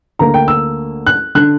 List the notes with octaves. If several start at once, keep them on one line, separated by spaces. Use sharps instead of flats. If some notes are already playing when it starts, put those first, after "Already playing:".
D2 D3 A#3 A#5
G5
E6
F#6
D3 F#6